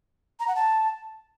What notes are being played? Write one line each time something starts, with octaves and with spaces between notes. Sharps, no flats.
A#5
F#5
A5